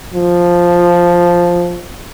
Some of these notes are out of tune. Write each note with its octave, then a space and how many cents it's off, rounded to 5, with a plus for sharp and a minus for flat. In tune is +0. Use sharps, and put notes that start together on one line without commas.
F3 +0